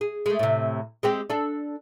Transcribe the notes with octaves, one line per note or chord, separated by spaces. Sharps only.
G#4
G#3 A3
A2 C3
G#3 C4 G4
D4 A4